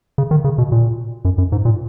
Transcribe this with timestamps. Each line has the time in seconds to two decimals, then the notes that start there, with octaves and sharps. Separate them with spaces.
0.18 C#3
0.31 D#3
0.44 C#3
0.58 B2
0.72 A#2
1.25 F#2
1.38 F#2
1.52 G#2
1.65 A#2